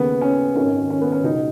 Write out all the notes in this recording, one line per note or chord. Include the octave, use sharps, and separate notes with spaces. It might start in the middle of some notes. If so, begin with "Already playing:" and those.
Already playing: D#2 C#3 B3
C#4
G#1 F#2 D#3 C#4
C#4
B3
C#4
C#2 B2 D#4